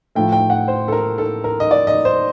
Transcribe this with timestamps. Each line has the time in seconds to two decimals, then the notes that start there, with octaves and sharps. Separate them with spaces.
0.15 A2 F3 A3 G5
0.32 G5
0.50 F#5
0.68 C5
0.88 A4
0.92 A#4
1.18 A4
1.44 A#4
1.60 D#5
1.71 D5
1.87 D#5
2.05 C5